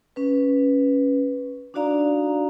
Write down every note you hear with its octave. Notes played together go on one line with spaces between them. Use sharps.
C#4 B4
D4 D#4 F#4 D5 F5 A#5